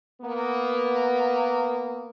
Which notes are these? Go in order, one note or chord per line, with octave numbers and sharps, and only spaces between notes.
A#3 B3